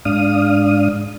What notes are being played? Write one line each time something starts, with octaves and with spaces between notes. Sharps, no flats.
G#2 D4 F5 D#6